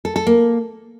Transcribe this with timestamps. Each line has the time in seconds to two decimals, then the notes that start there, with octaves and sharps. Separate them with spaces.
0.05 A4
0.16 A4
0.27 A#3